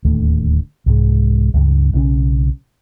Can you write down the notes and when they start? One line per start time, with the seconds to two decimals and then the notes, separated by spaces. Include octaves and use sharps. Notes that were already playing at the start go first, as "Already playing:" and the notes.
0.05 D1 D#2 D3 A3
0.86 C2 G#2 G#3
1.54 C#2 G2 C#3
1.93 B1 C#3 C4 C#4